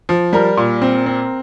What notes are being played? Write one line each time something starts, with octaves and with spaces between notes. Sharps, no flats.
F3
G3 A#4
A#2
C4
C4